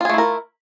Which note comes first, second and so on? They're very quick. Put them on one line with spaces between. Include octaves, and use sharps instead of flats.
F4 G#4 A3 E4 A#4